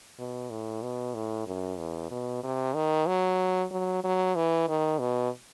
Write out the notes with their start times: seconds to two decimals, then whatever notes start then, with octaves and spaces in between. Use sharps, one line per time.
0.18 B2
0.50 A2
0.82 B2
1.14 A2
1.47 F#2
1.78 E2
2.11 B2
2.43 C3
2.75 D#3
3.07 F#3
3.71 F#3
4.04 F#3
4.36 E3
4.68 D#3
5.00 B2